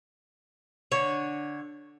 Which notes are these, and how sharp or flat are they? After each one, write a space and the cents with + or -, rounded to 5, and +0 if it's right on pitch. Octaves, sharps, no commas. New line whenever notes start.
D3 +0 C#5 +0